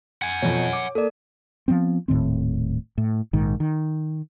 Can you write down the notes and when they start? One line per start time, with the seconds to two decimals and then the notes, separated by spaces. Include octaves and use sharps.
0.22 F#5 G#5
0.42 F2 B2 C#5
0.73 D6
0.95 A#3 A4 D5
1.68 F3 G3 B3 C4
2.08 D#1 A2 D#3 C4
2.98 A2
3.33 A#1 G#2 D#3
3.60 D#3